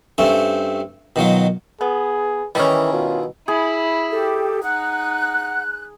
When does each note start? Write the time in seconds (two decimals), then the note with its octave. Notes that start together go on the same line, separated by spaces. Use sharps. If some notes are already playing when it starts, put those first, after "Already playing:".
0.18 G2 A3 C4 C#4
1.16 B2 D#3 F#3 F4
1.81 B3 G#4
2.55 D#3 E3 G3 C#4 E4 G#4
2.93 B2 F4
3.48 E4 G#4 B5
4.11 G4 A4
4.63 D#4 F#5 F#6